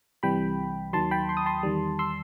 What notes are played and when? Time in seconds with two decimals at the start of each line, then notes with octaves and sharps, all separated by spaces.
0.23 C2 C3 E3 G3 G5 B5
0.93 D#2 D#3 F#3 A5 C6
1.11 G5 B5
1.29 C6
1.37 D#6
1.46 A5 C6
1.63 E2 D#3 G3
1.99 C6 E6